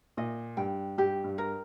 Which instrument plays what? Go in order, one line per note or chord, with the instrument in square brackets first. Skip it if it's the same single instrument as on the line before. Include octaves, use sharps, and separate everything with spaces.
[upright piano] A#2 [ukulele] D#5
[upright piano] G2 [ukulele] G5
[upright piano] G2 [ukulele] G4
[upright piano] G2
[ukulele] A#4